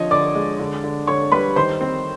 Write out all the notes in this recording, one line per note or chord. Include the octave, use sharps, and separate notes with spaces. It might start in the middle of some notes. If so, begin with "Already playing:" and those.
Already playing: D3 F3 C#5 D#5
D3 D5 D6
G#3
D3
D3
D3 C#5 C#6
G3 B4 B5
D#3 C5 C6
C4